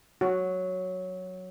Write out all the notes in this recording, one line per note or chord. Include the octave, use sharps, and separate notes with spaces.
F#3 F#4